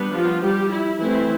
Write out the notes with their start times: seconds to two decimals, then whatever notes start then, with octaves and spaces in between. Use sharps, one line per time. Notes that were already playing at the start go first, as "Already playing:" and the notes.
Already playing: G3 B3 D4
0.14 F3 F4
0.42 G3 G4
0.71 E4
0.99 E3 A3 C4 E4